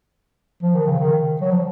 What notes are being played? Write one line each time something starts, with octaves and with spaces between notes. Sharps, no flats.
F3
D#3
C#3
D#3
F#3
F3